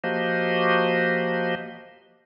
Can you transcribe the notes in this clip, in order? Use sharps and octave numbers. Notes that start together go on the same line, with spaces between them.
F3 A#3 F#4 G4 C5 D#5